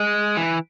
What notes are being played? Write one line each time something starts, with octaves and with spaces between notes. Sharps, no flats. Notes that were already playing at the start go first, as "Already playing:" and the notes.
Already playing: G#3
E3